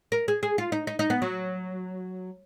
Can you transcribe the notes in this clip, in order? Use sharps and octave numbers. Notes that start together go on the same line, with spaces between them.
A#4
G#4
G#4
F4
D#4
D#4
D#4
B3
F#3